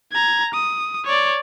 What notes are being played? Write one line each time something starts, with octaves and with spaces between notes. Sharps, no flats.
A#5 G#6
D#6
C#5 D5